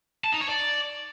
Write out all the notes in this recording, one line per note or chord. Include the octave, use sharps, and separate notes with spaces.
A5
D#4
C#5
D5